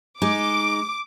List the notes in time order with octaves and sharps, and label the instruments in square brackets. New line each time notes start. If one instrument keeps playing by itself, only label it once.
[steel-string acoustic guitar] G#3 D#4 [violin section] D6